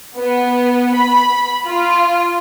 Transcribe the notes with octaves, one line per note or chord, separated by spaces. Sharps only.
B3
B5
F4